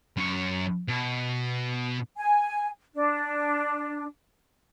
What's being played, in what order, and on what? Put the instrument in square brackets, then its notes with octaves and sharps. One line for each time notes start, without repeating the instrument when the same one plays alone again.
[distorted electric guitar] F#2 C#5
B2
[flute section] G#5
D4